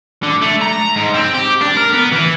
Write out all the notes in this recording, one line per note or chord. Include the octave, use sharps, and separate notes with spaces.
D3
A3
A#5
G#2
C4
G4
D4
A#4
B3
E3